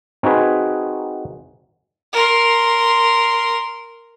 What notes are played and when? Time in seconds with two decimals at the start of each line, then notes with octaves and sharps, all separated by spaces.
0.23 C4 D#4 F#4 G#4 B4
2.13 A#4 C6